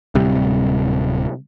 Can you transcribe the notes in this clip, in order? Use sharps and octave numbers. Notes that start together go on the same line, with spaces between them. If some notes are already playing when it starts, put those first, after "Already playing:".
D1 C3 G3